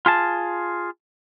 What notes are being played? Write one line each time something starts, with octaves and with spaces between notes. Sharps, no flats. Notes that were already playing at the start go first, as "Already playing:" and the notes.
F4 G#4 A5